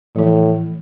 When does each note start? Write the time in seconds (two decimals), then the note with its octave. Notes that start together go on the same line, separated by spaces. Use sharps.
0.16 A2 E3 F3